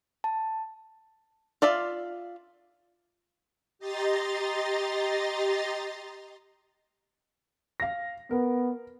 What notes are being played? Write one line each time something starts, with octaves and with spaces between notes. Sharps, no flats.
A5
F4 D5 E5 F5
G4 D#5 A#5 C6 A6
F5 A#6
B3 A#4